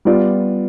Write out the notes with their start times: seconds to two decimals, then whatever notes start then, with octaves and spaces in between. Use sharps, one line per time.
0.05 G3 B3 F4 D5